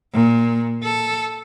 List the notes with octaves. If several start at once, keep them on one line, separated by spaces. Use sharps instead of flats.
A#2
A4